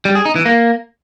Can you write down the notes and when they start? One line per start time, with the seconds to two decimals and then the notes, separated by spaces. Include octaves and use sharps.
0.05 G3
0.15 G#4
0.25 D#4
0.36 E3
0.46 A#3